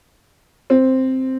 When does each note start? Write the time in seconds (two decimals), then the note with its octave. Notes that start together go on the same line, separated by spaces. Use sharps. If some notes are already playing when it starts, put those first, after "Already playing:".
0.70 C4